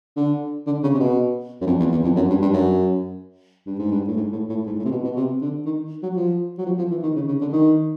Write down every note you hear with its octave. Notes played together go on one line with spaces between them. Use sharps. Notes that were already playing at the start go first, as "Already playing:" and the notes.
D3
D3
C#3
C3
B2
F#2
F2
E2
E2
F2
F#2
G2
G2
F#2
G2
G#2
G2
A2
G#2
A2
A2
G#2
A2
C3
B2
B2
C3
D3
D#3
F#3
F3
F#3
F3
F3
E3
D#3
C#3
C#3
D3
D#3